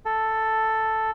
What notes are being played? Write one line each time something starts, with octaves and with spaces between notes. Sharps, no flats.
A4